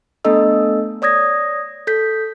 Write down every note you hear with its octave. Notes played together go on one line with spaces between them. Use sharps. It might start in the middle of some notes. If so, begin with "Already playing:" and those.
A3 B3 D4 A4 D#5 E6
C#5 D5 D#6 G#6 A#6
A4 G6 B6